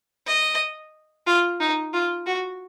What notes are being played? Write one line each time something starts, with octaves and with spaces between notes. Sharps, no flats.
D#5
F4
D#4
F4
F#4